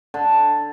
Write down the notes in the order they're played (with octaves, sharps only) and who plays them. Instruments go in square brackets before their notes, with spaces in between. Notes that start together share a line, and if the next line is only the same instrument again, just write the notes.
[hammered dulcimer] D3